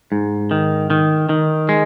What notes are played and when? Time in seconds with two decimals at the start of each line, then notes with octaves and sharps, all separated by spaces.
0.12 G#2
0.51 D#3
0.90 D#3
1.29 D#3
1.69 G#3